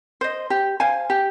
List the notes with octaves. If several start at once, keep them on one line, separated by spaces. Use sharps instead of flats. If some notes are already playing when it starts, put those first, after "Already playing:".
C5 D#5
G4
C5 F5 G#5
G4